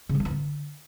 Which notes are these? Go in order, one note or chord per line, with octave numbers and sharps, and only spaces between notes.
C#3
G3
E4
B3
D3